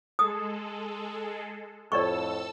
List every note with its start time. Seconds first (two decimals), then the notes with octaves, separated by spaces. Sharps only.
0.19 G#3 G#4 A4 D#6
1.92 F2 A2 A4 D5 D#5 A5 C#6 E6